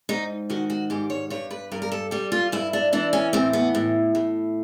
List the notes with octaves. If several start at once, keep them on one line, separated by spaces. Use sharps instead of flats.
G#2 D#4
D#3 F#4
F#4
G#2 G4
C#5
G2 C#5
B4
G2 A#4
A#4
A4
G3 G4
F4
G2 E4
D4
E3 D4
C#4
A2 C4
B3
A2
A2